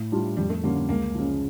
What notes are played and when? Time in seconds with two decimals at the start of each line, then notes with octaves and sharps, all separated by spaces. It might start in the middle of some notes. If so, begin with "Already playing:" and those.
Already playing: A2
0.12 G3 D4 F4
0.37 F2 G3
0.50 A3
0.63 D3 G3 A#3 C#4
0.76 A#3
0.89 C#2 A#3
1.15 C#3 F3